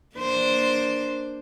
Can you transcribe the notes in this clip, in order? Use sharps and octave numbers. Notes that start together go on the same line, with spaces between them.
A#3 D4 C5